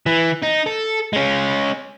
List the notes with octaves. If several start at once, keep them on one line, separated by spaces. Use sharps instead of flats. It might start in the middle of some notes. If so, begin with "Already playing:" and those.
E3
D#4
A4
G#3 C#4